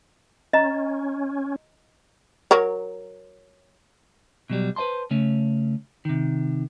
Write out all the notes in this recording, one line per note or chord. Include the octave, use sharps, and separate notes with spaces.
C#4 D#5 A#5
F#3 A#4 C#5
B2 F#3 G3
B4 C5 D#5 A5 C6
C#3 A3 C#4
C3 D#3